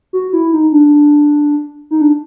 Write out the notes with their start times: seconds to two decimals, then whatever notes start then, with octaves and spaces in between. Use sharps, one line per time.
0.13 F#4
0.33 E4
0.53 D#4
0.72 D4
1.91 D#4
2.01 D4